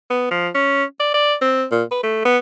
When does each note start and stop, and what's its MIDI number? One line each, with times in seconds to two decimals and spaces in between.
0.10 0.30 59
0.31 0.49 53
0.55 0.84 61
1.00 1.12 74
1.14 1.35 74
1.42 1.65 60
1.71 1.84 46
1.92 2.03 71
2.03 2.25 57
2.25 2.38 59